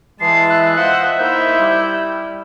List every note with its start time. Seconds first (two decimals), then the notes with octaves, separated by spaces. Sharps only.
0.21 E3 G#3 A5 C7
0.49 E5 F#6
0.77 F4 C5 D#5 F#5
1.19 A#3 D#4 E4 C5 G6
1.60 G3